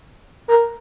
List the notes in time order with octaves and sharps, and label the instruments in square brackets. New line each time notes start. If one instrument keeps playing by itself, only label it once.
[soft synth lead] A#4